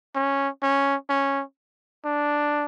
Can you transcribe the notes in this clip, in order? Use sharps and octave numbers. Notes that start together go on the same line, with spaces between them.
C#4
C#4
C#4
D4